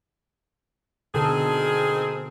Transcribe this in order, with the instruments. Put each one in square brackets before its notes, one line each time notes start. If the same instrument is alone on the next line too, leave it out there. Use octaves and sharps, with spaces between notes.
[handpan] B2 D3 A4 [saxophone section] D#3 C4 G#4